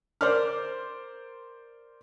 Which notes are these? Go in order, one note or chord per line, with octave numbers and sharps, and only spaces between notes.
A#4 C5 D5 D6 F6